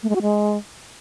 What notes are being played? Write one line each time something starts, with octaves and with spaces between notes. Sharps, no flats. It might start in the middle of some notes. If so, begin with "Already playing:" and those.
A3
G#3
F#4
G#3